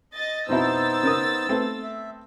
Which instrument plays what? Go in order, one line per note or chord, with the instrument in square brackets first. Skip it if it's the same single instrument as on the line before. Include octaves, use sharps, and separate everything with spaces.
[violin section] D#5 A6
[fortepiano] F2 B2 E4 [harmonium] B3 D#4 C5 [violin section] E6 A6
[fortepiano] C#3 A#4 D#6
A3 B3 C4
[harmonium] E5